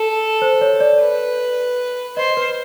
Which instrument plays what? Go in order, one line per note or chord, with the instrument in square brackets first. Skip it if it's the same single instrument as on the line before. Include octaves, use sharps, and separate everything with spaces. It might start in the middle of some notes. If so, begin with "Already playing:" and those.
Already playing: [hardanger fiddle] A4
[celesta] C5
C#5
D5
[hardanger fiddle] B4
[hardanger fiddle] C5 [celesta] D#5
[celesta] B4